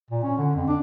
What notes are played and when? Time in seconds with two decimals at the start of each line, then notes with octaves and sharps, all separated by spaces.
0.10 A#2
0.23 C#4
0.38 D3
0.55 F2
0.68 D4